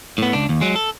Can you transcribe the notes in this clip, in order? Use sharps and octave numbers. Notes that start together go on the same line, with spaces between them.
A2 B3
C#2 D4
D#2
F#3 G#3
A4